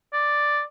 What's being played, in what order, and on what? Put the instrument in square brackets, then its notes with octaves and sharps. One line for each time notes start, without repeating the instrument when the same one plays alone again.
[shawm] D5